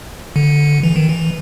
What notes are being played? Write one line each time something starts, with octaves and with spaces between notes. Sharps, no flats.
D3
E3
D#3
E3